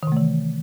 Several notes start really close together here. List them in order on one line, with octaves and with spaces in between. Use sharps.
D#3 C3 A3 E3